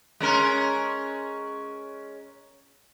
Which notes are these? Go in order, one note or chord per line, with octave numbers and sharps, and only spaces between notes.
G#3 C#4 A#4